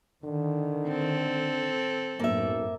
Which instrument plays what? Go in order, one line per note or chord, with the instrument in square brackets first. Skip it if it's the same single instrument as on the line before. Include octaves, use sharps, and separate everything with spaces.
[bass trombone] D3 [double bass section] D#3
[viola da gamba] C4 A4
[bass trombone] B1 [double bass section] F#2 A2 [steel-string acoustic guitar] A#3 E5